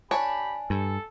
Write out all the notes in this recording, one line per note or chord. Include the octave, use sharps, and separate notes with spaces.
D4 G4 C#5 G#5 B5
G2 A4